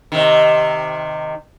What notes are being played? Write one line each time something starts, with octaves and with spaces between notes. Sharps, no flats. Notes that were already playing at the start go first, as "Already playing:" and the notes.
C3 D#3